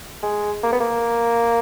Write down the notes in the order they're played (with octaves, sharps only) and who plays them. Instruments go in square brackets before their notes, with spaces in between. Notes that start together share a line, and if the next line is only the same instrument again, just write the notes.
[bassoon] G#3
A#3
B3
A#3